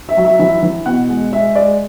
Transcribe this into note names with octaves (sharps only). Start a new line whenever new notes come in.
E5
F#3
E5
E3 E5
E3
B2 F#5
G#3
G#3 E5
G#3 D5